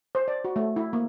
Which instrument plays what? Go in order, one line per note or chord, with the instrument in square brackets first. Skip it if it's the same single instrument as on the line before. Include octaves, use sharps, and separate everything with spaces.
[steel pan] C5
D5
F#4
A3
E4
A#3